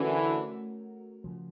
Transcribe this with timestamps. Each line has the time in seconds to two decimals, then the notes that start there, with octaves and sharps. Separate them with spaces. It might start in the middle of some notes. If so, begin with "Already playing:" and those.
Already playing: D3 E3 A3 C#4 F#4 A#4
1.24 C#3 F3